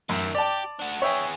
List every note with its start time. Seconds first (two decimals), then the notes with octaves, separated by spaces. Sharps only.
0.09 F#2 D#3 A3
0.35 G4 D5 A5
0.80 D4 F#4
1.02 B3 G#4 C#5 E5 G5